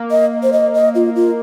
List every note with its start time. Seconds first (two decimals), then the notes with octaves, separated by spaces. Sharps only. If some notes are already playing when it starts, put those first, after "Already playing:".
Already playing: A#3
0.11 D#5
0.43 C5
0.53 D#5
0.74 D#5
0.95 F4
1.16 F4